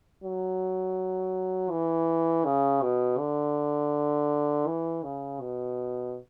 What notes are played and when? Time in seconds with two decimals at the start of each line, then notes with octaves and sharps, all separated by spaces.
0.24 F#3
1.71 E3
2.45 C#3
2.82 B2
3.19 D3
4.67 E3
5.03 C#3
5.41 B2